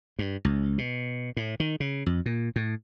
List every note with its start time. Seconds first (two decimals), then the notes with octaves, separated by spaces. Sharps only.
0.19 G2
0.45 C#2
0.78 B2
1.37 A2
1.60 D#3
1.80 C#3
2.06 F2
2.26 A#2
2.56 A2